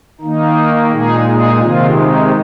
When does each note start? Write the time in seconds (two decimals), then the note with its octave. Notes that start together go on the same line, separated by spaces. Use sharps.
0.21 D#3 A#3 D#4
0.91 A#2 G#3 D#4 G#4
1.26 D#4 G#4
1.61 C3 D#3 G#3 C4 F4
1.97 D#4